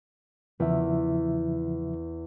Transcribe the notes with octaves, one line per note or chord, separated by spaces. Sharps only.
E2 C#3 F3 E5